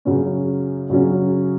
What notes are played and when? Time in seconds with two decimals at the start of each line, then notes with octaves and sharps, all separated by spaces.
0.05 F#2 C#3 F#3 C#4
0.90 F#2 C#3 F#3 C#4